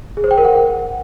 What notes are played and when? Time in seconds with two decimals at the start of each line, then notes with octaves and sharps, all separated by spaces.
0.17 G#4
0.24 C5
0.31 G5
0.38 A#4
0.45 F#5